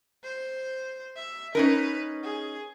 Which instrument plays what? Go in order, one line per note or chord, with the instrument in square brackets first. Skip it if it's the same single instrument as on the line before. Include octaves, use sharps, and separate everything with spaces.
[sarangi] C5
E5
[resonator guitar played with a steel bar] C#4 D#4 A#4 [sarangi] B4
[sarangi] G#4